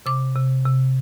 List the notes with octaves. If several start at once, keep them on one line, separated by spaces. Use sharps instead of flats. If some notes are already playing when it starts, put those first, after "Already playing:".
C3 D6
C3
C3